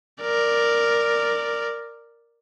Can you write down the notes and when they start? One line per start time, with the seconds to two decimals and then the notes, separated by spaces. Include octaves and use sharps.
0.22 A#4 D5